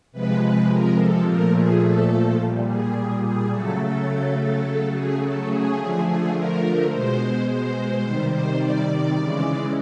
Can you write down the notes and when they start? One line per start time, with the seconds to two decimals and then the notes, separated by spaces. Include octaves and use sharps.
0.12 C3 F3 G#3 B4
0.41 B4
0.69 A#4
0.97 A4
1.25 A#2 F3 A3 A#4
1.54 G#4
1.81 A4
2.38 A#2 G3
2.66 G#4
3.23 G#4
3.51 C#3 F#3 A3 A4
3.80 A4
4.36 A4
4.64 C#3 F#3 A3
4.92 G#4
5.21 A4
5.49 G#4
5.77 D3 F3 A3
6.05 G#4
6.33 A#4
6.90 B2 G#3 C5
7.47 C5
8.03 C3 D#3 G3
8.32 C5
8.60 D5
9.16 C#3 E3 G#3